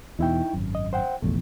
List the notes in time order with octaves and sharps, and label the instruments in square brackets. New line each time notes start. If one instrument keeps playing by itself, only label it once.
[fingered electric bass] E2 B2 [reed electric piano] D#4 E4 G5
[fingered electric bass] G#1 F#2
[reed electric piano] D#5
C5 F#5 G5
[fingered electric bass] F1 A#1 E2 [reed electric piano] A3